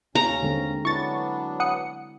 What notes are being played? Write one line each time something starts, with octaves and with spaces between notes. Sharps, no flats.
D#2 C#4 A#5
D3 G#3 C4
F#3 B3 D4 E4 C#6 A6
F#5 D#6 C#7